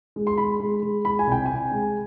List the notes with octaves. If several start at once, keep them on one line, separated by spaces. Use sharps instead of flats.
G#3
C6
G#3 B5
G#3
G#3
G#3 B5
G#5
C2 G5
C3 G#5
G#3